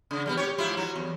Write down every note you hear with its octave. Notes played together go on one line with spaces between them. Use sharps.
C#3
G3 G#3 B3
G4 C#5
G#2 E4 F4
F#3
E2